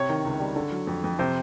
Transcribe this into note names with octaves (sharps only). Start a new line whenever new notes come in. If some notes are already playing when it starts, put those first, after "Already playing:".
Already playing: C3 C#5
D#3
C#2
G3
D3
F#3
F2
F2
C3 C5